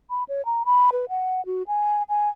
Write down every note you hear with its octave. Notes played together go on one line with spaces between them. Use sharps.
B5
C#5
A#5
B5
B4
F#5
F#4
G#5
G#5